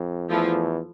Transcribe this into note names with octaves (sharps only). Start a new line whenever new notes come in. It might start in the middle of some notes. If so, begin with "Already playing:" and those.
Already playing: F2
E2 F3 A3 E4